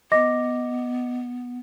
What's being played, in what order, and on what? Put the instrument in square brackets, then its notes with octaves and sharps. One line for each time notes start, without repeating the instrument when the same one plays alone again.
[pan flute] B3 [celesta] D#5 D6 A#6